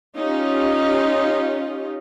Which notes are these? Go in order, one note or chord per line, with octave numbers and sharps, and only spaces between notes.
C#4 D#4 F4 G4